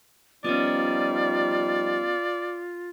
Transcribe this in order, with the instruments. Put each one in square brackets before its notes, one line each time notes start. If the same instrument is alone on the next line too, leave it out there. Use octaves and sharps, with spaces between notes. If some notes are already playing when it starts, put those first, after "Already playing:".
[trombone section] F3 G3 D#4 [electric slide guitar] B3 C#4 [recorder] F4 [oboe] D5